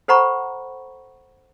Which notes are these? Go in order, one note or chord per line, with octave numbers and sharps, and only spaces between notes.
A4 C5 F#5 A#5 B5 C#6